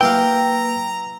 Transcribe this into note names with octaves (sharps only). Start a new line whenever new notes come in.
F#3 A#3 E4 G4 B4 F5 G5 A#5